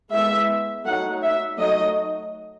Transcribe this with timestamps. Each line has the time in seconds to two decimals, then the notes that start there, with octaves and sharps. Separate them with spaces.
0.14 G#3 B3 E4 E5
0.86 F#3 A3 D#4 F#5
1.23 E5
1.59 F#3 A3 D#4 D#5